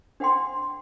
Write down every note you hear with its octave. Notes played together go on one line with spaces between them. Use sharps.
D4 C5 F#5 G5 C6